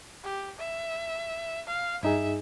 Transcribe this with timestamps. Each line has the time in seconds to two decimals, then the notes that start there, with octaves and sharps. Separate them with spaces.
0.24 G4
0.59 E5
1.68 F5
2.03 G2 D#4 G#4 E5